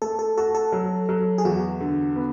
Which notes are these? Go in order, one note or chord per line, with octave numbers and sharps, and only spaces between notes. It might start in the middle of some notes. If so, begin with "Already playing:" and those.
A3 A4
A4
F#4 A4
A4
F#3
F#3
G#4
E2 F#4
D3
B3